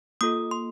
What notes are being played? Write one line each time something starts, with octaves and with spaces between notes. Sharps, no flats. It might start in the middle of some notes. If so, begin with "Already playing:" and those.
A#3 F4 A4 D#6
C6